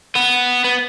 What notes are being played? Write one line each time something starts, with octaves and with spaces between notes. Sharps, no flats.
B3
B3